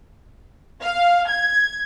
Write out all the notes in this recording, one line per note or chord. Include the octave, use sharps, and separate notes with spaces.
F5
G#6